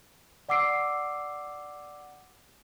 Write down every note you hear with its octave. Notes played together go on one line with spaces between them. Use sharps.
D5 F#5 D6 E6 C7 D7